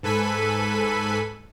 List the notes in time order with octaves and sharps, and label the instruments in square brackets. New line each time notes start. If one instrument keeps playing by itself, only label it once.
[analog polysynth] G#2 A4 B4 G#5 B5 B6